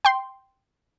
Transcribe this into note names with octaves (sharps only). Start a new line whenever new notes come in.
G5 C6